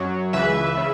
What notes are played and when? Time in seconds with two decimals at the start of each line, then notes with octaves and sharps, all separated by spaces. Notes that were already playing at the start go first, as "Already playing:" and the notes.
Already playing: F#2 F#3 C#5
0.33 C#2 C#3 E3 B4 E5
0.77 C#3